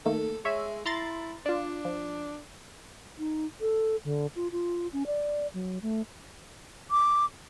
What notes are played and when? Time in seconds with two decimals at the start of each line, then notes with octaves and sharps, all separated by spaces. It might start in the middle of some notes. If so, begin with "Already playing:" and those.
0.06 D#3 A3 A#3 A4
0.45 G#3 C#5 E5
0.86 E4 A#5 C6 A6
1.46 D4 F4 D5
1.85 F3
3.19 D#4
3.61 A4
4.05 D3
4.36 F4
4.52 F4
4.93 C#4
5.07 D5
5.54 F#3
5.82 A3
6.91 D6